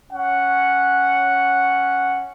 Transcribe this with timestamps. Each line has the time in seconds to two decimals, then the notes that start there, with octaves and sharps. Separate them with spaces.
0.12 C#4 F#5